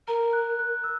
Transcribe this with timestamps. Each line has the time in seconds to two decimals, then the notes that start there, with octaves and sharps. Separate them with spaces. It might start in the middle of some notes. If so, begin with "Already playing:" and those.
0.07 A#4 A#5
0.33 F#6
0.59 F#6
0.84 E6